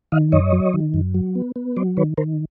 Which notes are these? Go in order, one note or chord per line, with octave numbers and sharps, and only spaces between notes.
D#3 D#5 F5
F#2 C#5 D#5
F#3
D#3
F#2
F#3
B3
B3
F#3 C5 D5
D#3 B4 C#5
D#3 A#4 C5